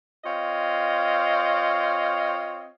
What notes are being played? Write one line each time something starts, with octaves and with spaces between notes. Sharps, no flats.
C4 F4 C#5 D#5 F5